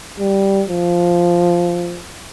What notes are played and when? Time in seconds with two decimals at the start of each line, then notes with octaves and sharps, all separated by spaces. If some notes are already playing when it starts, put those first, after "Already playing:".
0.19 G3
0.69 F3